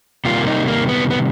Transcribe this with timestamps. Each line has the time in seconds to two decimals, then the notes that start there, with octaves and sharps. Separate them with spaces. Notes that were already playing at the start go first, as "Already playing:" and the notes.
0.25 C3 D#3 G3 A#3 F4
0.47 D#4
0.68 A#3
0.88 B3
1.11 B3